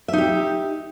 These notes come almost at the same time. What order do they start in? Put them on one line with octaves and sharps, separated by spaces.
E5 D#4 G4